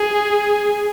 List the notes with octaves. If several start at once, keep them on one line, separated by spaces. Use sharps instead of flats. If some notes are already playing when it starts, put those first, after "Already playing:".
Already playing: G#4